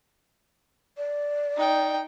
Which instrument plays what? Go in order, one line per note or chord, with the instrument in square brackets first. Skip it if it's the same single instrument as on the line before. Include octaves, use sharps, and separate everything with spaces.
[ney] D5
[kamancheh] D#4 G5